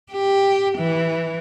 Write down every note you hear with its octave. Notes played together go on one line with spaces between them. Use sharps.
G4
E3